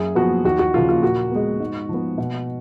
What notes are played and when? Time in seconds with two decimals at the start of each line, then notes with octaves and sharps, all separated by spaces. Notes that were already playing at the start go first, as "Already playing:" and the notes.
Already playing: F#2 G#4
0.15 F3 B3 F#4
0.44 D#2 F#4
0.59 F#4
0.73 C#3 F3 A#3 F4
0.89 F4
1.02 A#2 F#4
1.31 G#3 B3
1.60 G#2
1.89 F3 B3
2.18 B2